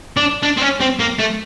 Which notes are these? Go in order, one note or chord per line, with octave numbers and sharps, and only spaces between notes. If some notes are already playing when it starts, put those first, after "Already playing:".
D4
D4
C4
C#4
C4
A#3
A3